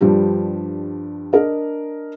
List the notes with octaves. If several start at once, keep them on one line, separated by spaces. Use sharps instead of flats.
G2 F3 G3 D4 G4
D4 A#4 D#5